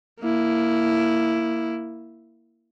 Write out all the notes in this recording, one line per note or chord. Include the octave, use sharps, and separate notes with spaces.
A#3 E4